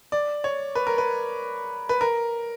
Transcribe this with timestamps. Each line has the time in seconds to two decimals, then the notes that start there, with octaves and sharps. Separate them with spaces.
0.12 D5
0.44 C#5
0.75 B4
0.87 A#4
0.98 B4
1.89 B4
2.01 A#4